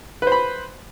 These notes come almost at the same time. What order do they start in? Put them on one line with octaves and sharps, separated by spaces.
B4 C5 B5